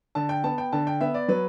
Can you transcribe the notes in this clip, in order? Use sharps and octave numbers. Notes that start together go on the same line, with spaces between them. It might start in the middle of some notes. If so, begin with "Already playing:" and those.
D3 A5
G5
B3 A5
G5
D3 A5
G5
B3 E5
D5
F#3 B4